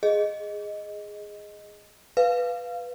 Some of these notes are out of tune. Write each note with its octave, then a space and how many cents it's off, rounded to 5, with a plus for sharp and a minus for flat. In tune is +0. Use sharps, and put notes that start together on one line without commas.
G#4 +0 D#5 +0
B4 +0 F5 +0